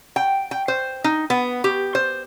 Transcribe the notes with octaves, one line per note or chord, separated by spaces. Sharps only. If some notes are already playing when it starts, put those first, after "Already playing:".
G5
G5
C5
D#4
B3
G4
C5